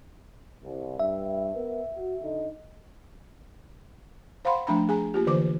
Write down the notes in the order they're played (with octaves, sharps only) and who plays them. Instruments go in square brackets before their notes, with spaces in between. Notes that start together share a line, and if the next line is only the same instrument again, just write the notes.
[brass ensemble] C2
[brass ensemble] G2 [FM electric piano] E5
[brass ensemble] B3 A#4 B4
F#4
D3 D#4
[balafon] C5 F5 F#5 B5 C6
F3 A3 D4 A#5 B5
G#4 G#5 A#5
A#3 F4 G4
D3 E3 B4 C5 D6